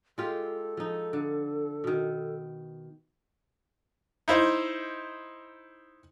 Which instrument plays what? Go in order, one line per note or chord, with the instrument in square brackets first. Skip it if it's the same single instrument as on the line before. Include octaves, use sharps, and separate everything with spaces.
[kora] G#3 F4 G4 [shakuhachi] A4
[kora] F3 D#4
D3
B2 D#3
[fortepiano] D#4 E4 C5